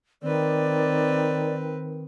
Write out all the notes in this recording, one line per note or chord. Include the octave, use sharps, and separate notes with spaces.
D#3 C4 B4 D5